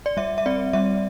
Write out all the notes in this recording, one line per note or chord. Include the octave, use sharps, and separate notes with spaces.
D5
G3 E5
E5
C4 D5
G3 E5